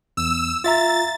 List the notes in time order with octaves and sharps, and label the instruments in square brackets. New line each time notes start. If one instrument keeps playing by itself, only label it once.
[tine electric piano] E2 [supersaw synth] E6
[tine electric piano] F4 E5 A#5 [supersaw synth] A6